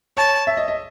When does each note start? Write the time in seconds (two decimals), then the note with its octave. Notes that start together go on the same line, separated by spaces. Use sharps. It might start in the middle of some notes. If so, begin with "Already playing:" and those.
0.17 C#5 A5
0.47 E5
0.57 D#5
0.68 D#5